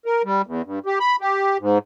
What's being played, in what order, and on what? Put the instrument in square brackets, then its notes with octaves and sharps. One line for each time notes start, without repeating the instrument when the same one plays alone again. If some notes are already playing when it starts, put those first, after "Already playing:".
[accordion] A#4
G3
E2
G2
G4
B5
G4
G#2